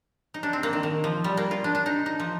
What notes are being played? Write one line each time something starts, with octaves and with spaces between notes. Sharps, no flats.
D#4
D4
C4
A#3
D#3
D#3
F3
G3
A#3
F4
D4
D4
D#4
D#4
F3